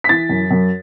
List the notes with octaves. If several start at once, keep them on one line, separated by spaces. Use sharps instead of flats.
B6
E3 A6
F#2
F#2